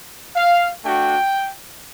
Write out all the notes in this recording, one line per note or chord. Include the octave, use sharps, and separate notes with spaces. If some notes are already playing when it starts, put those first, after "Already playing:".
F5
A3 D4 F#4 G5